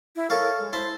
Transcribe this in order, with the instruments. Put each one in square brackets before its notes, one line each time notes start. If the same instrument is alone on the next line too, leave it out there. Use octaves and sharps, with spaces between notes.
[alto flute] E4
[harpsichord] A4 C#5 F5 [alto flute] A#4
[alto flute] G#3
[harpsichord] E4 A5 C6 [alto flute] C5